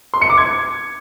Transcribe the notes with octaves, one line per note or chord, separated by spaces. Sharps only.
C6
C#7
D6
G#6